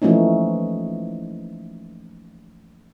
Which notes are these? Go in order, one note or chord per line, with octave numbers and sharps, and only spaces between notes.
E3 F3 A3 A#3 C#4 D#4